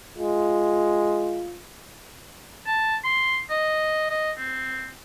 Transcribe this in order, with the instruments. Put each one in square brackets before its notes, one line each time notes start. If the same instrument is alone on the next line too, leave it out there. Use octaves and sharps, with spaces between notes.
[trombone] G#3 [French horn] F4
[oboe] A5
C6
D#5
D#5
C4